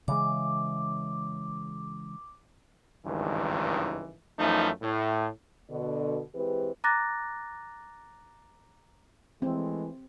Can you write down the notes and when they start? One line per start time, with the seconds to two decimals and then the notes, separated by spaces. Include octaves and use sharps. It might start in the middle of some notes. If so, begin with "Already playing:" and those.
0.08 C#3 E3 G#3 D6
3.05 G#1 C#2 G2 D#3 E3
4.39 F#2 E3 F3 A3 D#4
4.82 A2
5.71 B2 D3
6.34 E3 G#3 C4 G4 B4
6.84 A#5 D6 F#6 A6 A#6
9.42 E3 G#3 A3 C4